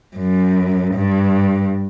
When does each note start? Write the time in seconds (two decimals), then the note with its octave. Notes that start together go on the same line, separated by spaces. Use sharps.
0.16 F#2
0.95 G2